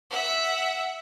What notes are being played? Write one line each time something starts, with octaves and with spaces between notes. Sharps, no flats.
E5 F#5